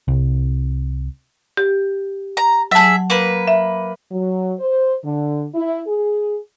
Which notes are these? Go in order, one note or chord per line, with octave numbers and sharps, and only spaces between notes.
C2
G4
A#5
F#3 G#4 E5 A5
A#3 B4
E5
F#3
C5
D3
E4
G#4